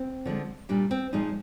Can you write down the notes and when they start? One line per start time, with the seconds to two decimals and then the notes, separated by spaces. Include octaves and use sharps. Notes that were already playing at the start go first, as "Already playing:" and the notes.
Already playing: C4
0.25 D3 F3 G#3
0.69 A#2 G3 D4
0.91 C4
1.13 A#2 F3 G#3 D#4